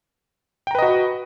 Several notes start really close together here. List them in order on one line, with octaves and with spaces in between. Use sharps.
G5 A#5 B4 D#5 F#4